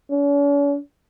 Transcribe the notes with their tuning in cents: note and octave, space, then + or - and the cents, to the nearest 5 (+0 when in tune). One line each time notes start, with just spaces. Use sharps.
C#4 +45